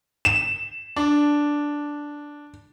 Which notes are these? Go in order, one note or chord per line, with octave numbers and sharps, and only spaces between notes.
E7
D4